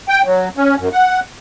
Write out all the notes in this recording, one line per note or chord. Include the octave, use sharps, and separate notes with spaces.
G5
F#3
C#4
F#2
F#5